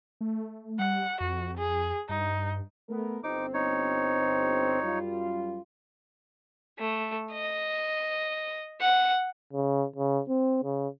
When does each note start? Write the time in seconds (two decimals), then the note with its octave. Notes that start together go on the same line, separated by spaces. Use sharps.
0.21 A3
0.79 G3 F#5
1.20 F2 F#4
1.57 G#4
2.09 G2 D#4
2.89 A3 B3 A#4
3.24 G1 C4 D#4 D6
3.54 D#4 C#5
4.82 F#2 G3 F4
6.79 A3
7.32 D#5
8.81 F#5
9.53 C#3
9.96 C#3
10.29 C4
10.64 C#3